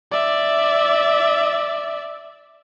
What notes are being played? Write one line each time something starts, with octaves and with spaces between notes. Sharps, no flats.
D5 E5